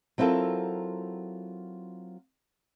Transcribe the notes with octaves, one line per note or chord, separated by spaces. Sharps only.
F#3 C4 E4 F4 A4 A#4